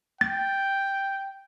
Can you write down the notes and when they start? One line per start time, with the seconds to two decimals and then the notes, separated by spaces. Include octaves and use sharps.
0.21 G5 A6